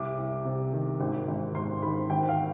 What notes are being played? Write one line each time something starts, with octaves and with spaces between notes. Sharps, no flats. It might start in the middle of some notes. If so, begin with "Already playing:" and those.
Already playing: C2 D6
C2
C3
D#3
G#1
G#1
G#2 C6
D#3 B5
G#1 G5
F5